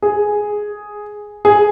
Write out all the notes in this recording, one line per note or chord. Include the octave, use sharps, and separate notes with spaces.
G#4
G#4